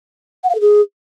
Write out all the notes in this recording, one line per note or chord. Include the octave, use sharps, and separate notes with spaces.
F#5
F5
A4
G#4